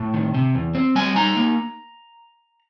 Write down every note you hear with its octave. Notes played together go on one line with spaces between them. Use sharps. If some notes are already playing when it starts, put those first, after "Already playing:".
Already playing: A2 A5
D#3
C3
E2
C4
G3 G#5
D#4 A#5
A#3